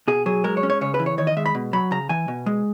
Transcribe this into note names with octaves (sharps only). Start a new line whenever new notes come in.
B2 G#4
F#3 G#4
G#3 A#4
C#5
C#4
C#5
C#3 C#5
B4
E3
C#5
D#3 C#5
D#5
G#3 E5
B5
B2
F#3 B5
C#3 A#5
E3 G#5
B2
G#3